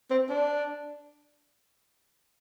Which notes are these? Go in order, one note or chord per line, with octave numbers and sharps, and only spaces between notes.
C4
D4